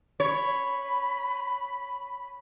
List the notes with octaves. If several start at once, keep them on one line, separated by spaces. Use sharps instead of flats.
C#5 B5